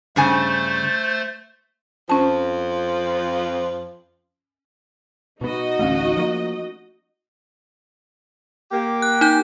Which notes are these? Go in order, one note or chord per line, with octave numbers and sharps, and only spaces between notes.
G2 C#3 A3 C5 G#5 A6
F2 F3 C#4 A5
B2 B3 D#4 F#4 D#5
A1 D2 A3 C#4
F3 A#3
A#3 G4
F#6
D#4 G6